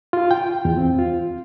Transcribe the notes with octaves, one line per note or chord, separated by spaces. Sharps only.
F4
G5
E2
C4
F4